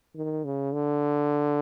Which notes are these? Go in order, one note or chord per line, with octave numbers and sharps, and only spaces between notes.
D#3
C#3
D3